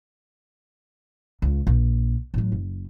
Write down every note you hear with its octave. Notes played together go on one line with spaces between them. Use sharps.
C#2
A#1
A1 F#3
F#1